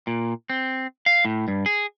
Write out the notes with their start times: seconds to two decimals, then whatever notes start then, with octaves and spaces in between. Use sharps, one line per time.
0.07 A#2
0.50 C4
1.06 F5
1.25 A2
1.48 G2
1.66 G#4